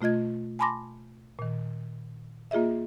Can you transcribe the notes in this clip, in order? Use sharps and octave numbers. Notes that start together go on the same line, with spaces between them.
B2 A3 F4 D#5 G#6
G#5 A5 B5 C6 D6 A#6
A#2 D#3
A#3 F4 G#4 D#5 E5